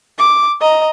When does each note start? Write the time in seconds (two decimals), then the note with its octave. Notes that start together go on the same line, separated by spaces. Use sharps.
0.18 D6
0.61 D#5 A#5